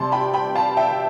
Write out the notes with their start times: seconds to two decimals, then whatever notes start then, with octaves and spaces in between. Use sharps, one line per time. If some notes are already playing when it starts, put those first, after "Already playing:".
Already playing: C3 G3 A5 C6
0.12 G5 B5
0.34 G5 B5
0.55 F5 A5
0.77 E5 G5